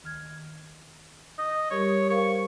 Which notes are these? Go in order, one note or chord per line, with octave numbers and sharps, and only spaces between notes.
D#3 F6 G#6
D#5
G3 G4 A#4 C#5
A#4 C5 F5 C#6